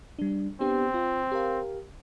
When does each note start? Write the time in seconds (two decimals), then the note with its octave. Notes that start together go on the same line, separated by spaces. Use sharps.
0.19 G3 D4
0.60 B3 C4 D4 G4
0.94 F4
1.32 G4 A#4 F5